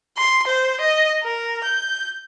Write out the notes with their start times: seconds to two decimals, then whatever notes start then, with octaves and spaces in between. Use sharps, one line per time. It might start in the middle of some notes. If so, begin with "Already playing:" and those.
0.18 C6
0.47 C5
0.81 D#5
1.24 A#4
1.64 G6